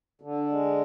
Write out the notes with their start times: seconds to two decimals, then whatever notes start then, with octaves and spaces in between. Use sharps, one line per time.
0.22 D3
0.50 G#3